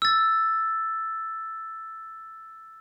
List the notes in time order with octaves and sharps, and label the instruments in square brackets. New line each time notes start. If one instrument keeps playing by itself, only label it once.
[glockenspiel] E6 A6